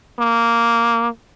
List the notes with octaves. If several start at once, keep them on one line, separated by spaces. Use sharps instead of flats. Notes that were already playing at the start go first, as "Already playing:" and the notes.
A#3